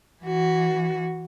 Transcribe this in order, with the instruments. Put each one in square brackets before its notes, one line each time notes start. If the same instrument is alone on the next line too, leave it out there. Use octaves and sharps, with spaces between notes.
[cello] E3 F#4